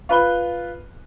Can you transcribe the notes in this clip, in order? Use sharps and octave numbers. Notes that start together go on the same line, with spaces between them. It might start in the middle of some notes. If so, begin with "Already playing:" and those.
F4 B4 B5 G7